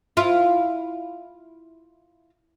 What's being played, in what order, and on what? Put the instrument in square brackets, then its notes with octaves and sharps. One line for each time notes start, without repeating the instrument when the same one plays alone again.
[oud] E4 F4